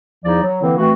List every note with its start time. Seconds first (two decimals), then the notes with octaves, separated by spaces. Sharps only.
0.25 E2 F3 D#4 E4 D5
0.43 F#3
0.61 D3 E3 A#3 C4 E4
0.77 E3 A3 C4 F#4